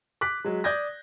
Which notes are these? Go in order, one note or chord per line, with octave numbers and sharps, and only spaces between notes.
D6 F#6 B6
F#3 G#3
D5 D#6 G6 G#6 A#6